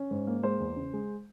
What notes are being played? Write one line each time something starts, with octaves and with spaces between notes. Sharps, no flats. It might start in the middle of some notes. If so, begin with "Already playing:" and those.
Already playing: C#4
G#2
A#3
G#3 C5
E2
C#3
G#3